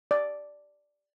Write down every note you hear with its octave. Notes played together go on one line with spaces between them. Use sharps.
D5